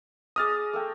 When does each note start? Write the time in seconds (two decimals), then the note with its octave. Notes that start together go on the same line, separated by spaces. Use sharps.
0.36 G#4 D5 D#5 D#6 F6 A6
0.73 A3 E5 G5